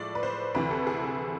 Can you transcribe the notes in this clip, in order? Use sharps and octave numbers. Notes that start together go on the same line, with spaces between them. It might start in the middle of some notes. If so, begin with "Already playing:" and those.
Already playing: A2 F3 G#3 D5
B4
C5
D2 C3 E3 B4
A4
G#4
A4